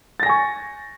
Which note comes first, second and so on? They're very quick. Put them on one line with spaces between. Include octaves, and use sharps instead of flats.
A6 A#6 G#5 C#6